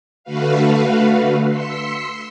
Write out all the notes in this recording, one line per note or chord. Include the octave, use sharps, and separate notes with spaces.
D3 A3 F#4 B4 F5
C6 E6 B6 C#7